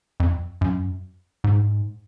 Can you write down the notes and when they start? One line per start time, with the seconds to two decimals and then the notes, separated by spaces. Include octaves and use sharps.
0.20 F2
0.61 F#2
1.44 G#2